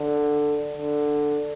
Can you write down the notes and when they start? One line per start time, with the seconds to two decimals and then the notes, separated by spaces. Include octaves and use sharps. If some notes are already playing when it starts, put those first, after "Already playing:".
Already playing: D3
0.77 D3